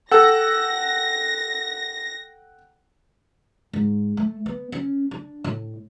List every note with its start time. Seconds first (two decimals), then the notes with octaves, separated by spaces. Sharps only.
0.11 A4 F#5 G5 E6 A#6
3.73 G#2
4.17 A3
4.46 B3
4.72 C#4
5.11 D4
5.44 A2